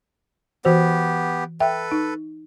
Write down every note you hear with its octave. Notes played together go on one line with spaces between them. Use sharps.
E3 B3 F#4 G4 C5
A4 B4 E5 G5
D#4